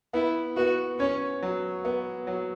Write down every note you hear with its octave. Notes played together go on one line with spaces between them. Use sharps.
B3 E4
B3 F#4
C#4 C#5
F#3
B3
F#3